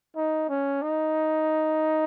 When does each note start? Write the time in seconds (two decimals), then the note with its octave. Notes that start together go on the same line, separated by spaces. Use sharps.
0.16 D#4
0.49 C#4
0.83 D#4